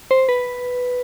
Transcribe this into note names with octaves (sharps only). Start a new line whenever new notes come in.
C5
B4